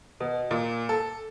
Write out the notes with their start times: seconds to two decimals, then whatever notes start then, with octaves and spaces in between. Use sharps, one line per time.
0.20 B2
0.51 A#2
0.89 A4